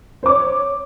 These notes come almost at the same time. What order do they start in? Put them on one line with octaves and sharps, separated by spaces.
C5 D6 C#5